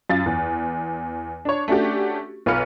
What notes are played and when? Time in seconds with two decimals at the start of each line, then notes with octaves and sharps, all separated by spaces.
0.10 F#2 F4 A6
0.26 E2
1.45 D4 C#5
1.68 A3 C#4 D4 F#4 G4
2.46 B1 B3 F4 B4 F6 C#7